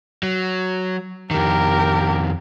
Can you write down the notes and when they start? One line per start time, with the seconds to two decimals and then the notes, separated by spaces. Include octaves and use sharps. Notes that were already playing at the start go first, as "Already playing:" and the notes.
0.23 F#3
1.31 F2 D#3 G4 A#4